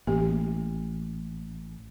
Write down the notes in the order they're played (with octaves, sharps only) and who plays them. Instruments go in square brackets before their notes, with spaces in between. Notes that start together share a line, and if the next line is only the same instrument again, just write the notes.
[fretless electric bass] A1 [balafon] A#3 G4